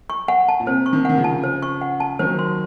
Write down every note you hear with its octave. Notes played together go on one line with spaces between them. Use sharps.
C#6
F#5
A5
A#2
C3 C5
C#6
C3 D#3
D#3 F#5
C#3 F3
A5
C5
C#6
F#5
A5
D#3 F#3 C5
C6